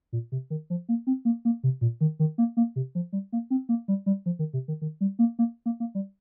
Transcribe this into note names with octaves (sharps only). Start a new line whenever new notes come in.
A#2
C3
D#3
F3
A#3
C4
A#3
A#3
C3
A#2
D#3
D#3
A#3
A#3
C3
F3
G3
A#3
C4
A#3
G3
G3
F3
D#3
C3
D#3
D#3
G3
A#3
A#3
A#3
A#3
G3